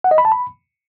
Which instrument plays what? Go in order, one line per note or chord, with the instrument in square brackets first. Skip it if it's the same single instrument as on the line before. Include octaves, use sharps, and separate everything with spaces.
[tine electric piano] F#5
D#5
B5
A5
B5